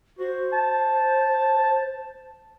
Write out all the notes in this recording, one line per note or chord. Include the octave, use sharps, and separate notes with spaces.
F#4 C5
A5